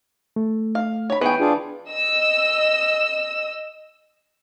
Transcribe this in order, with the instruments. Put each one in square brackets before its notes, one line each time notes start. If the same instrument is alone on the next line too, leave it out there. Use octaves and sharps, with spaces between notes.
[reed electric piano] A3
[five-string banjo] F5
C#5 B5
[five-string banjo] E3 G5 [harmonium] B3 G#4 C#5 [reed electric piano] B4
[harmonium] D4 F4 G#4
[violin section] D#5 E6